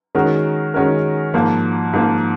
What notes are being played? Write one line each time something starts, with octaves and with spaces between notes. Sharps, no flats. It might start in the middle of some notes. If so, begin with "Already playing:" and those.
D#3 G#3 C#4 F#4 A#4
D#3 G#3 C#4 F#4 A#4
G#2 F3 A#3
G#2 F3 A#3